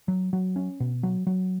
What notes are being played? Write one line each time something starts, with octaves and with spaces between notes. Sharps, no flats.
F#3
F#3
C#4
B2
F#3
F#3